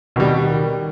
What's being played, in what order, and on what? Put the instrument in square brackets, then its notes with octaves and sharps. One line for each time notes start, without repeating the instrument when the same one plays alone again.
[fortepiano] B2 G3 [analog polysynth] D#3